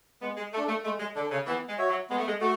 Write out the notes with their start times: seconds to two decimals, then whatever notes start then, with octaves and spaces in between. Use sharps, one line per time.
0.21 G#3 B3
0.37 G#3
0.53 A3 D4 A4
0.68 A3
0.84 G#3 A3
1.00 G#3
1.16 D3 D4 A4
1.31 C#3
1.46 E3 B3
1.68 G#3
1.78 F#4 C#5 E5
1.89 F#3
2.10 G#3 B3
2.18 A3
2.27 G#3
2.41 A3 F#4